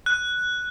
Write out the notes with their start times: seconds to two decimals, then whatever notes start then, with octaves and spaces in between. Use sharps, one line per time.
0.06 F#6